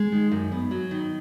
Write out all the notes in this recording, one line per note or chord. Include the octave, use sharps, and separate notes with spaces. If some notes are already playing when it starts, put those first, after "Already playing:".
Already playing: G#3
D#3
F#2
B3
F#3
D#3